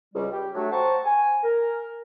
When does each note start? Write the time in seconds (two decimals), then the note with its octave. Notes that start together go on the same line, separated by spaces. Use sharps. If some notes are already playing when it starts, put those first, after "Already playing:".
0.14 C#2 G3
0.32 G4
0.54 F#3 A3 D4
0.71 C5 F#5 G5 A5 A#5 C#6
1.04 G#5
1.43 A#4